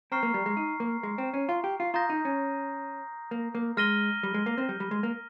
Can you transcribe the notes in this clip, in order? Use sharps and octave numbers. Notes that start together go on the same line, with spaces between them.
C4 A#5 C#6 F6 C7
A#3
G3
G#3
D#4
A#3
G#3
C4
C#4
F4
G4
F4
F4 A#5 D#6 G6 A#6
D#4
C#4
A#3
A#3
G#3 F6 A#6 D#7 G7
G3
G#3
A#3
C4
G3
G3
G#3
A#3